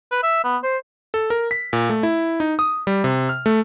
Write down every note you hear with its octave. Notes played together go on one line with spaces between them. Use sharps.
B4
E5
B3
C5
A4
A#4
B6
A#2
A3
E4
D#4
D#6
G3
C3
F6
A3